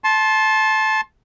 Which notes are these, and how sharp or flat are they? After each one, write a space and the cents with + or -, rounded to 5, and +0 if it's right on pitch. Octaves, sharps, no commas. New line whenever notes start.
A5 -15 C6 +20